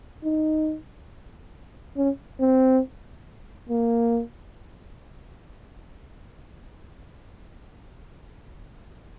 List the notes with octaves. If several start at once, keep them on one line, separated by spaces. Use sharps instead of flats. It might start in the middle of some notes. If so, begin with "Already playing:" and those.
D#4
C#4
C4
A#3